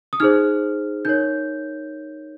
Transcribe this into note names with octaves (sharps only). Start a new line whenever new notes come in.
D#6
D#4 G#4 C5 F6
D#4 A#4 C#5 G6